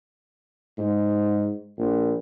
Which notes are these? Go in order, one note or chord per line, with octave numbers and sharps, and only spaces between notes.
G#2
A#1